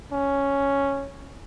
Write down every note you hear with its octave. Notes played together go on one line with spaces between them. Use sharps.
C#4